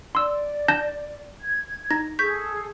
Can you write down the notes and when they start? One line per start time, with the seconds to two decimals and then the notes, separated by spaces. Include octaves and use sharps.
0.15 D5 C6 E6
0.68 A5 G6 A#6
1.41 G#6
1.91 D#4 A#6
2.19 G#4 A4 C#6 G6 B6